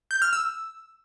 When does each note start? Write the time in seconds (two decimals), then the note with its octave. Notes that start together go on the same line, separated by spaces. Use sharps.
0.11 G6
0.22 F6
0.33 E6